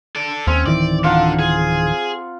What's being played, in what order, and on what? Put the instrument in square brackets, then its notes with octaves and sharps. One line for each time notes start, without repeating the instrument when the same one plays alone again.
[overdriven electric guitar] A4 D5
[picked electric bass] D#2 [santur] C4 [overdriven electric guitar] C#4
[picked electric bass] D1 D#3 E3 [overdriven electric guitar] D5
[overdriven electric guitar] D4 A4 [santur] F4 F#5 A#5
[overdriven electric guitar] G#4